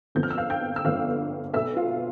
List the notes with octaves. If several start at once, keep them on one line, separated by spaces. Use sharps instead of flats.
G1 F2 D3 F3 B3 G6
F6
E6
F5 F6
G5 G6
E6
G1 F2 D3 F3 B3 F5 F6
B1 B2 B3 E5 E6
F4 F5